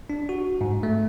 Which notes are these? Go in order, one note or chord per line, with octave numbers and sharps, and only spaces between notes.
D4
F#4
G#2
A3